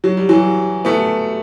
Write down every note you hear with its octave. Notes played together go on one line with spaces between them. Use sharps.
F#3
G3
E3 F#3
A3 B3